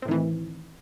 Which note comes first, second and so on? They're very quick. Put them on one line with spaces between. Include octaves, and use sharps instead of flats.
C4 A2 D#3 E3